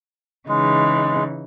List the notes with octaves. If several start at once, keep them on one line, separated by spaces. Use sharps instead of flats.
C#3 E3 G#3 D#4